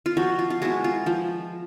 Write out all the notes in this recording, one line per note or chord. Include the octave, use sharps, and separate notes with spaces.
F4
F3 F#4
F4
F4
G#3 B3 E4 F#4
F4
F3